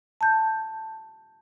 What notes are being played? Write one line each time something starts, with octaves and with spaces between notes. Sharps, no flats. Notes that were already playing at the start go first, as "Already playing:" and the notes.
A5 G6